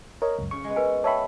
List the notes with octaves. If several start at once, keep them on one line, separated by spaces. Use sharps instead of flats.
A#4 C#5 D#5
C#2 F#2
C#3 C#6
G#3 B3
A#4 B4 G#5
C#5 E5 G5 A5 B5